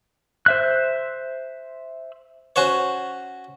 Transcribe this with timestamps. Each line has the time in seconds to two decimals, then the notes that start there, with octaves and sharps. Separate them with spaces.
0.46 C5 E5 F#6
2.56 C#4 F#4 C5 C#5